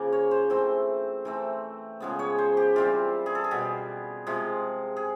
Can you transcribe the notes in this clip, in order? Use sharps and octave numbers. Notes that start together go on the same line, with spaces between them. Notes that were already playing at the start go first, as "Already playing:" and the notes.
Already playing: C#3 F3 A#3
C#5
C5
E3 A3 C4 C5
E3 A3 C4
C#3 F3 G#3 B3
C#5
C5
G4
E3 G3 C4 F4
G#4
A4
G#4
B2 G3 B3
C3 F3 G#3
G#4